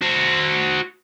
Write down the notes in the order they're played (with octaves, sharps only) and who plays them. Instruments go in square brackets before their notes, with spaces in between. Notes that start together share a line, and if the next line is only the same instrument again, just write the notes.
[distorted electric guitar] F#4 C5